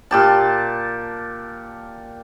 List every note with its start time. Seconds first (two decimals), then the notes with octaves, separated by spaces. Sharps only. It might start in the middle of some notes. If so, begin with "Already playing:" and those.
0.11 A#2 G4 A5